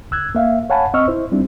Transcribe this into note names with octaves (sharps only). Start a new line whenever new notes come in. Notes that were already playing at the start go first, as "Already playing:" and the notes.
C#2 E6 F#6 G#6
A#3 E5 F5
C#5 F5 F#5 G#5 A5 B5
C4 D#5 C#6 E6 F6
E4 C5
G3 C4 D4 E4